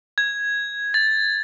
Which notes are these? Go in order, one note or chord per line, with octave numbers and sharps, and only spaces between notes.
G#6
A6